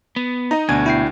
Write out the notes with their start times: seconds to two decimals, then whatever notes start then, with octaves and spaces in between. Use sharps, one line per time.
0.16 B3
0.51 D#4 D#5 A#5
0.69 D2 B2 D4 G#5 G#6
0.86 E4 G5 C7